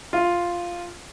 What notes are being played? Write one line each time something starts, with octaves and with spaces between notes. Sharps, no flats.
F4